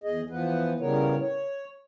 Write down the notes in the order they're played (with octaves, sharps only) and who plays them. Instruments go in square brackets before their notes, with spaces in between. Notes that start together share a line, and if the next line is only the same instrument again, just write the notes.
[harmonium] E2 G#4 D#5
E3 F3 B3 B4
A2 C#3 G3 B3 A#4 C#5
C#5